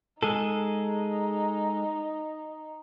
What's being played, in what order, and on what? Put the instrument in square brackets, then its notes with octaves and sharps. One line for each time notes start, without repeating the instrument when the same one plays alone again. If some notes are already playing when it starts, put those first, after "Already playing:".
[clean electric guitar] G#3 G#4 A4 [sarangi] D#4